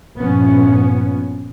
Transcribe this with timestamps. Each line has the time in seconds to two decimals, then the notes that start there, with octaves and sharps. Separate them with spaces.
0.21 G2 A#2 F3 B3 C#4